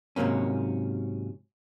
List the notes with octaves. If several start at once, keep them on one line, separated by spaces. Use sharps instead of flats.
G#2 C3 F#3 A#3 C#4